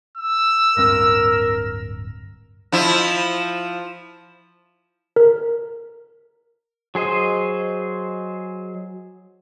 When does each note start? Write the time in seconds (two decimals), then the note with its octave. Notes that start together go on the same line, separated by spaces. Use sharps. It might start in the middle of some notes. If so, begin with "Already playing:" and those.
0.17 E6
0.77 D1 G2 C4 A#4
2.72 F3 E4
5.16 A#4
6.95 F#3 G#4 C5 D#5